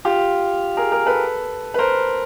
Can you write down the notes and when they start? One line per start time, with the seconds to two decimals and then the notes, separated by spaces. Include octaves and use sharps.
0.05 F4 G4
0.77 G#4 A#4
0.92 G#4 A#4
1.06 A4 B4
1.74 B4
1.79 A#4 C5